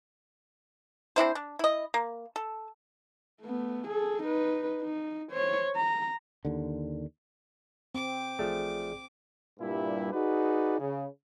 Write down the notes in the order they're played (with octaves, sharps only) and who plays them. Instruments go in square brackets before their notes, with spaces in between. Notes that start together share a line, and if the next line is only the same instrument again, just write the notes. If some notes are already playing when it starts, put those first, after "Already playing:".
[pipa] C4 D4 E4 C5
D4
E4 D#5
A#3
A4
[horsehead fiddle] A3 B3
G#4 A4
D#4 B4
D#4
C5 C#5
A#5
[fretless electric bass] D#2 D3
[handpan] C4 [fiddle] D6
[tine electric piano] A1 G#4 D5 [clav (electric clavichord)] F3 A3
[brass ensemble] G2 A#2 G3 E4
D#4 F#4 G#4 B4 D5
C#3